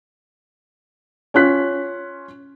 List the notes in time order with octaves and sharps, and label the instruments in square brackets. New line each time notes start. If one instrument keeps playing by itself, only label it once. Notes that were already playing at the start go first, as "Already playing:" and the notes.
[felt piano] C#4 F4 F#6 B6